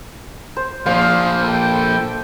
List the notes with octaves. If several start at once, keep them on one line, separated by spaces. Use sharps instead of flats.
C5
A#2 F3 G#4 C5 D5 F5 C6
A4 G5